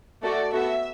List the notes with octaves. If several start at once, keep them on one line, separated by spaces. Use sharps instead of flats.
A3 F#4 A4 D5
B3 F#4 A4 E5